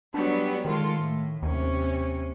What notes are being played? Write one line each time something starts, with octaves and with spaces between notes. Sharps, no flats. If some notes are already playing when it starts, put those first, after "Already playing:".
F#3 G3 B3 D4
D#3 G#3 F4 A4
A2
D#2 C3 C#4